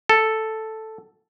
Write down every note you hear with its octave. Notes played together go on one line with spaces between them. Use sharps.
A4